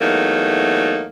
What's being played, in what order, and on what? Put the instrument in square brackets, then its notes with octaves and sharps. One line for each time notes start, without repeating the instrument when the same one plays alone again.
[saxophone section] E2 F#3 A3 A#3 D#4